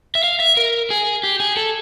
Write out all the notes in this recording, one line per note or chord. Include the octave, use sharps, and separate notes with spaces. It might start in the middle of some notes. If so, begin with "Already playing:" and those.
E5
F5
E5
A#4
G#4
G4
G#4
A4